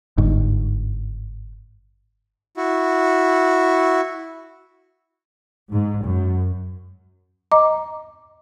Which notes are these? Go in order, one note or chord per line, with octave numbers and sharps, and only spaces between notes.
G1 G#2
E4 F#4
G#2
F#2
D#5 A#5 D6